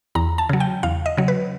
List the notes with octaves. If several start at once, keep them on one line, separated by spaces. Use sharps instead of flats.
E2 A#5
A5
C#3 F#3
G5
E2 F5
D#5
C#3 F#3
B4